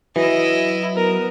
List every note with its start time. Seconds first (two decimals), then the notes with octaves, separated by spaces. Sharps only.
0.16 E3 F#3 E4 D#5
0.95 B3 A#4